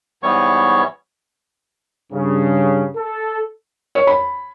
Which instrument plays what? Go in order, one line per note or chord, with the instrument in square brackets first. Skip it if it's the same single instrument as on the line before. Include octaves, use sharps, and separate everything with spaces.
[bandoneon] G#2 E3 G3 B3 C#5 C#6
[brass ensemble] G2 C#3
A4
[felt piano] C#5
B5